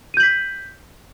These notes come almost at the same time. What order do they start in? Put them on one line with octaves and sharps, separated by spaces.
D#7 G6 F#7 B6